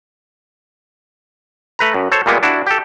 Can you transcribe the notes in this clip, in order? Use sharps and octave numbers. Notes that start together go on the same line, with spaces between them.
A3 B4 A#5
F#2
A4 C5 C#5
A#2 G3 G#3 A#3 B3
D4 E4 F#4
G4 A4